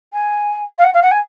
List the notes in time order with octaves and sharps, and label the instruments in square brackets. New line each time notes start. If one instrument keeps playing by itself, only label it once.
[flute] G#5
F5
F#5
F5
F#5
G#5